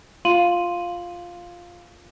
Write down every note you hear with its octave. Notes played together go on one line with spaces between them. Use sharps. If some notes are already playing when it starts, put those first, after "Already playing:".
F4 F5 C6 D#7 F#7